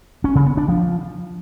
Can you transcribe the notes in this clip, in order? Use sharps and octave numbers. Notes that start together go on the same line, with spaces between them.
C#4
C#3
B3
D4
F3